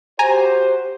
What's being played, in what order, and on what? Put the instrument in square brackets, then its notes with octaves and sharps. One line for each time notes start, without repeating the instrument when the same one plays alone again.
[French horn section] F#4 G4 C5 [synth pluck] G#5 A#5